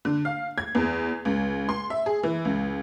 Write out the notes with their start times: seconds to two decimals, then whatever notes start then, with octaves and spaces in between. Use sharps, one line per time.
0.05 D3
0.25 F5
0.58 G#6
0.75 E2
1.25 C#2
1.69 C6
1.90 E5
2.06 G#4
2.23 E3
2.45 C#2